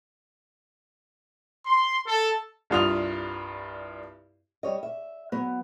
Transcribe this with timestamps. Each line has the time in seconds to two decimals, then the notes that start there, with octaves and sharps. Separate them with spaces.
1.66 C6
2.06 A4
2.70 C2 G2 F4 D#6 F7
4.63 G3 C#5 D#5
4.83 E5
5.32 F#3 B3